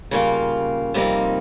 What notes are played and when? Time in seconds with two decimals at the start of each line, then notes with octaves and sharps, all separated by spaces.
0.11 C#3 G3 A#3 F4
0.94 F2 C3 G3 A#3 D#4